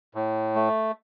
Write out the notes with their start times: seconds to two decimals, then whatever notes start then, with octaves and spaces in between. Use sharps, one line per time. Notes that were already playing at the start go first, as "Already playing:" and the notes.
0.15 A2
0.55 A3